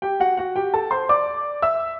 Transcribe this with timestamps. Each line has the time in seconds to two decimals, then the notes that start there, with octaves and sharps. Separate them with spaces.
0.02 G4 G5
0.20 F#4 F#5
0.37 F#4 F#5
0.56 G4 G5
0.74 A4 A5
0.91 C5 C6
1.09 D5 D6
1.62 E5 E6